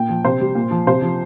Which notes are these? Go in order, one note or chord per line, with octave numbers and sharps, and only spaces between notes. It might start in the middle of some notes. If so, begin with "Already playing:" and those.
Already playing: A#2 G5
F3
C3 C5
G3
A#2
F3
C3 C5
F3